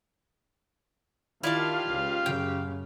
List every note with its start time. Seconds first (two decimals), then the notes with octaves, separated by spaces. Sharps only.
1.43 D#3 E4 F4 G4 D5 F5 A5
1.90 C#2
2.26 F#2 C#3 G5